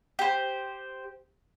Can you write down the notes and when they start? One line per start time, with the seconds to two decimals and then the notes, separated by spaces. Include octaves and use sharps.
0.19 G4 C5